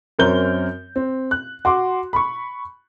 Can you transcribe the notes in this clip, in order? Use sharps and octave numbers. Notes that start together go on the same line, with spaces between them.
F#2 C4 A#4 C#5 G6 G7
C4
F#6
F#4 C6 D6
B5 C#6